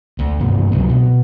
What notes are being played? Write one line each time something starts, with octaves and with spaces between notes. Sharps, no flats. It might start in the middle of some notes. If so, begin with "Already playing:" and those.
D2
F#1 G2 C3 A#3
C#2 C3 F#3
B2